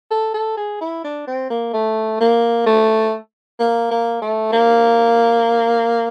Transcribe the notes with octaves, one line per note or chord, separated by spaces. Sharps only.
A4
A4
G#4
E4
D4
C4
A#3
A3
A#3
A3
A#3
A#3
A3
A#3